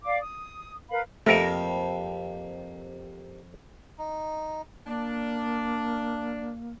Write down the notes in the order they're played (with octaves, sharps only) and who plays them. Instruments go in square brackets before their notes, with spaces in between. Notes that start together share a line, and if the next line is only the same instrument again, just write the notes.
[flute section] D5 F5 D6
D#6
A#4 B4 F5 B5
[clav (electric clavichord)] F2 A#4 [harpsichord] C3 F3 A#3 [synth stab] A3
[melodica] D#4
[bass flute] A#3 [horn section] D4